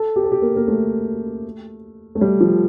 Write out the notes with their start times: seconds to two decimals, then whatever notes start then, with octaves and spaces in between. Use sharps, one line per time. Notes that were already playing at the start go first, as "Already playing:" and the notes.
Already playing: A4
0.16 G4
0.24 A4
0.32 G4
0.42 A#3
0.56 A#3
0.68 A3
2.15 A3
2.21 G3
2.40 F3